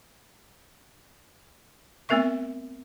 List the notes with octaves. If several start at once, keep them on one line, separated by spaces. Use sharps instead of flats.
A3 B3 C4 A#4 E5 C#6